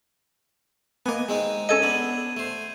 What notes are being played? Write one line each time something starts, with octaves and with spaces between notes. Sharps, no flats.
A#3 B3 D#5 G#5
G#3 C4 D#4
C#4 A4 D#5 G#6 D#7
B3 D4
A3 C5